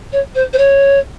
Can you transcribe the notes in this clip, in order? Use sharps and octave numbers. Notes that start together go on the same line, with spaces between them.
C#5
C5
C5
C#5